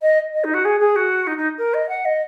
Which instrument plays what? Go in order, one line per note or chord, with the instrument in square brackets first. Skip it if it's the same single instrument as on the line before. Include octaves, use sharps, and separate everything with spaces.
[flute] D#5
D#5
D#4
F#4
G#4
G#4
F#4
D#4
D#4
A#4
D#5
F#5
D#5